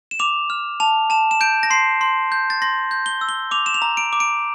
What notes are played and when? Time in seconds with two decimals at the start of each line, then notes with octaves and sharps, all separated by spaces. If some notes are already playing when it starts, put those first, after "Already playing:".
0.11 E7
0.19 D6 F7
0.50 F6
0.80 A5 F7
1.10 A5 E7
1.31 E7
1.41 G6 D7
1.63 A#6
1.70 C6 C7
2.01 C6
2.32 G6
2.50 A6
2.62 C6 A#6
2.91 G6
3.06 G7
3.21 E6
3.29 G7
3.51 D6 F7
3.66 E7
3.74 F7
3.82 A#5
3.97 D7
4.13 D6
4.20 D7